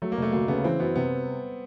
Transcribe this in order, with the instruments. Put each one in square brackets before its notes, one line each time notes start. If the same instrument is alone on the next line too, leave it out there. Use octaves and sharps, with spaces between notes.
[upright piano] F#3 [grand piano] A3
[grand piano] A#3
[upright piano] F1
[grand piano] A3
[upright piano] D2 [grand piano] A#3
[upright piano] C#3 [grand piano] B3
[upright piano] E3 [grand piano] C4
[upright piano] F#2 [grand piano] B3
[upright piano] C3 [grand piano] B3